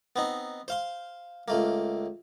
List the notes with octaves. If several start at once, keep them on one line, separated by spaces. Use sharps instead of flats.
B3 C4 D#4
C5 F5 C6
C#2 A3 A#3